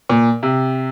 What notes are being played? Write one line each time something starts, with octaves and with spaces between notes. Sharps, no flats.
A#2
C3